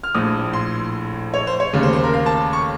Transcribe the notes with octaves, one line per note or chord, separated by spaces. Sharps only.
F6
A#1 A2 A3 D#6
C6
C#5
C5
C#5
D#2 C#3 A3
C5
C5
A#4
F5
A5
C#6